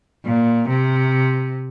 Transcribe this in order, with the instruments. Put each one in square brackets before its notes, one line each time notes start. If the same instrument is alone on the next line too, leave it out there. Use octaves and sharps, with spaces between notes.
[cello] A#2
C3